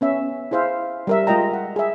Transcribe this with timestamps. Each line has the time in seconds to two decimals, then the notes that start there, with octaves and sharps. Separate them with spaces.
0.01 B3 C#4 E5
0.51 E4 G#4 C5 E5 F5
1.07 G3 A#4 E5
1.27 G3 G#3 F4 D#5 G5 A#5
1.53 F#5
1.76 G#4 E5